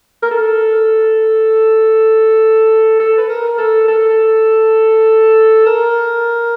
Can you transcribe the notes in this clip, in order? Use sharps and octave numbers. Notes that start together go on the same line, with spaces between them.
A#4
A4
A4
B4
A#4
A4
A4
A#4